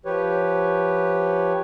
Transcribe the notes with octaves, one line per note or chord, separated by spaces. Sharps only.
F3 G4 B4 C#5